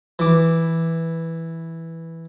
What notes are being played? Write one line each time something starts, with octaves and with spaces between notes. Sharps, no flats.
E3 D6